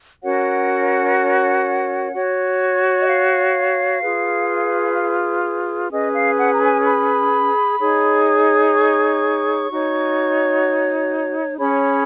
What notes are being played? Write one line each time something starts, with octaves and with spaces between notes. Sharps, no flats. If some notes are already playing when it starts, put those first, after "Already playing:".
C#4 F#4 A#4 C#5 F#5
F#4 C#5
D#5
F5
F4 G#4 B4
C#4 G#4 B4 D#5
F5
F#5
A#5
G#5
B5
D#4 G#4 C#5
C#6
D#4 F#4 C#5
C#4 G#4 C#5 B5